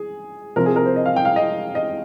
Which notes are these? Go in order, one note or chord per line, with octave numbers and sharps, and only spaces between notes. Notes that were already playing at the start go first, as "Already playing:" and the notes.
Already playing: G#4
C3 F3 C4 A#4
G#4
A#4
C5
D#5
F5
G5
F5
D#5
D#5